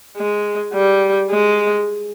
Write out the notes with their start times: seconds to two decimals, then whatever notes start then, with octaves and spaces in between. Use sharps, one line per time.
0.17 G#3
0.74 G3
1.31 G#3